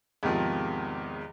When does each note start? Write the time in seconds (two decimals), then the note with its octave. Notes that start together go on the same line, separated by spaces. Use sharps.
0.23 E2 G#2 C3 D#3 F3